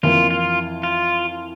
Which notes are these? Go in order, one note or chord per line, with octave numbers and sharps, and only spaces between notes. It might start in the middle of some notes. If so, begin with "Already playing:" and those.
F2 E3 A#3 E4 F4
F4
F4